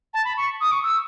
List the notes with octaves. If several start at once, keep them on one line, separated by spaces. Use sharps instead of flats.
A5
B5
C#6
D#6
C#6
E6